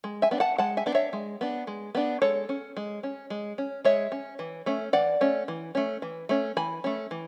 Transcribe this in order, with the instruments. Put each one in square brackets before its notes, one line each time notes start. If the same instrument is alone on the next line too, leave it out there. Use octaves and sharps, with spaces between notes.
[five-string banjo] G#3
E5 G#5
B3 D4
F#5 A5
G#3 F#5 A5
E5 G#5
B3 D4
C#5 E5
G#3
B3 D4
G#3
B3 D4
G#3 A4 C#5
C#4
G#3
C#4
G#3
C#4
G#3 C#5 E5
C#4
E3
A3 C#4
E3 D5 F#5
A3 C#4
E3
A3 C#4
E3
A3 C#4
E3 G#5 B5
A3 C#4
E3